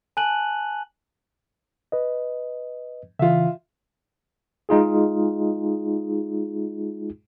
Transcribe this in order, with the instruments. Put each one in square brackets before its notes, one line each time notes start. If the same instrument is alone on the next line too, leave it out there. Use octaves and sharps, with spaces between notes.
[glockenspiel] G#5 A5 F#6 D#7 F#7
[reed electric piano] B4 D#5
[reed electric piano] C#3 E3 [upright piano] F4 E5
[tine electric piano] G#3 D#4 F4 G#4